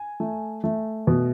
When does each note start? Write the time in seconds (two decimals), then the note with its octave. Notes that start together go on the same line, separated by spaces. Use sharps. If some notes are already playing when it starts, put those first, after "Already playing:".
Already playing: G#5
0.20 A3
0.64 A3
1.07 B2